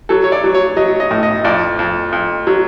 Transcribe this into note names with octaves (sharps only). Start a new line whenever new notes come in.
F#3 A4
C#5
D5
F#3
C#5
F#3 D#5
D#5
A2
D#5
F2 D5
F2
F2
F#3